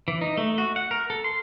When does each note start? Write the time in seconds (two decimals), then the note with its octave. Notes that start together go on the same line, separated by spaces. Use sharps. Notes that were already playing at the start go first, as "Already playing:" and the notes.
0.08 E3
0.21 D#4
0.37 A3
0.58 F#4
0.76 F#5
0.91 A#4
1.10 A4
1.24 C6